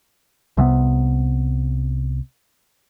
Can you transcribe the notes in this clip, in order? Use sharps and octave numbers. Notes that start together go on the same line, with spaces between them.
C2 C3 F3 B3